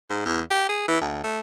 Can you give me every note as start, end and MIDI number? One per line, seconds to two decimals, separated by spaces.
0.10 0.25 44
0.25 0.40 40
0.50 0.65 67
0.69 0.86 68
0.88 0.99 52
1.01 1.20 38
1.23 1.40 57